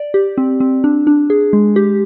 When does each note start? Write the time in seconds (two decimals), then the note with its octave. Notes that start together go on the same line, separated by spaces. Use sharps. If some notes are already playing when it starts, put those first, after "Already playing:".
Already playing: D5
0.14 G4
0.38 C4
0.60 C4
0.84 D4
1.07 D4
1.30 G#4
1.53 G#3
1.76 G4